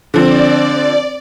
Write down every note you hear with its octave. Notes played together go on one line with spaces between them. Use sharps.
D3 F3 C4 D5